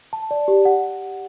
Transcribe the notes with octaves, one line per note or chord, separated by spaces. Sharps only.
A5
D5
G4
F#5